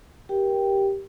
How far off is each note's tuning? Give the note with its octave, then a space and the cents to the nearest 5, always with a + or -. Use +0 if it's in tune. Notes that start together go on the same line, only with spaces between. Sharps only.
G4 +0 A#4 +20 G5 +0